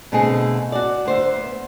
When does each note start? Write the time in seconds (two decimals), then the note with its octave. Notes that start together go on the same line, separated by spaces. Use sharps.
0.12 B2 D3 A3 C4 G#4 A5
0.72 F#4 D5
1.06 D2 C5 E5
1.36 B3